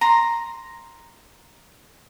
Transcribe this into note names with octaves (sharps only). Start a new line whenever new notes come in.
A#5 C6